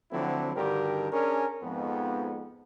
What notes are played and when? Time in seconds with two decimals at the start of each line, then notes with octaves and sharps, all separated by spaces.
0.11 D3 F3 F#3 A3 C4 E4
0.55 G2 D3 D#3 F#4 G4 A#4
1.11 C#4 D4 G#4 A#4
1.62 F2 G#2 B3